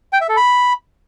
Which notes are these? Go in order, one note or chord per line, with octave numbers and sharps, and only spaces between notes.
G5
E5
A4
B5